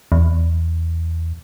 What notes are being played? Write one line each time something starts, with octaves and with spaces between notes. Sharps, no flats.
E2